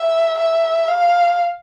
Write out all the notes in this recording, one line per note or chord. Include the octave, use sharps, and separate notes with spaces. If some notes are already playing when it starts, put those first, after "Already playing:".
Already playing: E5
E5
F5